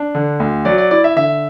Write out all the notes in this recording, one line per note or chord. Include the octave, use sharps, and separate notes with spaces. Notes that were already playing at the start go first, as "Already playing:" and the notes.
Already playing: D4
D3
D2
F#3 D5
D5
E4 D5
E5
D3 E5